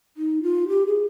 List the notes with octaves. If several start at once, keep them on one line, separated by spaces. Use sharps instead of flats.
D#4
F4
G4
G#4